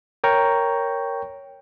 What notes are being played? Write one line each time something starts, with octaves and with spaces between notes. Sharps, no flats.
A#4 C#5 G5 A#5 C#6